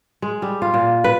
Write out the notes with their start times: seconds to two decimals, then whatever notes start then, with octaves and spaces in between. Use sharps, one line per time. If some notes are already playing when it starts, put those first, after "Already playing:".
0.22 G#3
0.42 G3
0.62 F4
0.74 A#2
1.04 B4